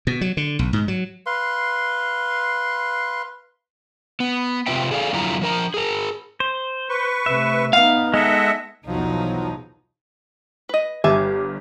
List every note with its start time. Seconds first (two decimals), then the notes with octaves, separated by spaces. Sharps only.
0.07 B2
0.21 F#3
0.37 D3
0.59 B1
0.73 G#2
0.88 F#3
1.26 B4 F5 C6
4.20 B3
4.67 C3 C4 F4 B4 E5 G5
4.91 G#4 A4 D5 F5
5.13 F2 D3 F#3 E4 F4 A#5
5.41 F3 A#4 A#5
5.74 G#4 A#4
6.40 C5
6.90 B4 C#6
7.26 C3 A3 E5
7.73 B3 D#4 F5
8.14 G#3 A4 D#5 E5 F#5
8.87 B1 E2 F3 F#3 D#4
10.69 B4 D#5
11.04 G1 G2 G4 E5 G#5 A5